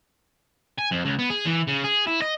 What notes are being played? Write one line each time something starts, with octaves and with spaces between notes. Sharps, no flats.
G#5
F2
C#2
B3
G#4
E3
C#3
G#4
E4
D#5